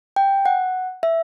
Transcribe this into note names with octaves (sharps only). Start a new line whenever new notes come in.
G5
F#5
E5